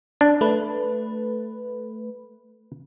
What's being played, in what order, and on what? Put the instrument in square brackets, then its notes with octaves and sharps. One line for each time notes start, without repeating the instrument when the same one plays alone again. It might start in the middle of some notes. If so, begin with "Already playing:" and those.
[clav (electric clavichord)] D4
[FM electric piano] A3 B4